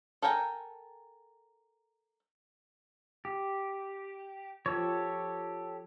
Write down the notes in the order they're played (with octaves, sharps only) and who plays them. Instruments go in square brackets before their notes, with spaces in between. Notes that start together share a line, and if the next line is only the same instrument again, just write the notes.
[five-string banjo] A4 A#4 G5 G#5 A#5
[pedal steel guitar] G4
[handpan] F3 [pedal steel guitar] G4 A4 C#5